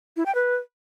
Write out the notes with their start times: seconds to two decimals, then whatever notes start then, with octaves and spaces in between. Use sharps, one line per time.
0.17 E4
0.26 G5
0.35 B4